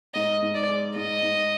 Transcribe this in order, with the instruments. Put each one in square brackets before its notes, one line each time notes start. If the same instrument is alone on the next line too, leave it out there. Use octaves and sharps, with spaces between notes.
[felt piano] G#2 [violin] D#5
[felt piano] G#2
[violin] D5
[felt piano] G#3
[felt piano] G#2 [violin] D#5
[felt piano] G#2